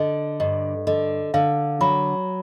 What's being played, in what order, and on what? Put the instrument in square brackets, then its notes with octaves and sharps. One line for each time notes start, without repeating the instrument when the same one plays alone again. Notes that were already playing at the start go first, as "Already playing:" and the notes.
Already playing: [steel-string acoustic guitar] D3 [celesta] D#5
[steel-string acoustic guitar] G2 [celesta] D#5
[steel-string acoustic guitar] D3 [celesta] D#5
[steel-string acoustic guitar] D3 [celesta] F5
[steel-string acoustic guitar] F#3 [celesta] B5